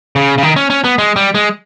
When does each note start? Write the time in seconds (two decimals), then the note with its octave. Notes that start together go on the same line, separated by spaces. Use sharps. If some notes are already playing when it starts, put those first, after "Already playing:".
0.16 C#3
0.38 C#3
0.43 D#3
0.56 C#4
0.70 C#4
0.84 B3
0.98 G#3
1.16 G3
1.35 G#3